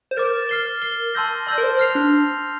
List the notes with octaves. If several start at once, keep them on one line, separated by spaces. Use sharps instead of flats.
C5
A#4 D6 A6 E7
F6 C7 G7
F6 C7 G7
A5 C6 E6 G6 A#6
D5 A5 C6 E6 G6 A#6
A#4
C5
F6 C7 F7
D4